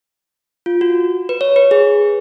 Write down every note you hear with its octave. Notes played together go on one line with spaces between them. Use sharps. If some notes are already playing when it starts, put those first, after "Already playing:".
F4
F#4
B4
C#5
B4
G#4